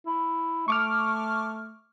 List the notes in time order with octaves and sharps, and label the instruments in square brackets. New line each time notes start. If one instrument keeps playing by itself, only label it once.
[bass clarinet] E4
[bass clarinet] A3 [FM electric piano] C#6 D6 F6